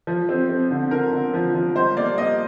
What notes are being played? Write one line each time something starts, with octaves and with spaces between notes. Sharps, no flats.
F3
C4
C4
D3
D3 A#4
D3
F3
F3
G3 C5
A#3 D5
A#3 D#5